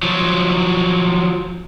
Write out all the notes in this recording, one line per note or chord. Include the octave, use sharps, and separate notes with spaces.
F3 F#3